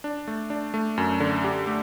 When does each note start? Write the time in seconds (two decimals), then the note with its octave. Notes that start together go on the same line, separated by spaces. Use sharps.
0.04 D4
0.27 A3
0.50 D4
0.74 A3
0.98 F#2
1.20 D3
1.44 G4
1.67 A3